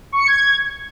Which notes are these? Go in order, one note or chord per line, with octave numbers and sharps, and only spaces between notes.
C#6
C#7
G#6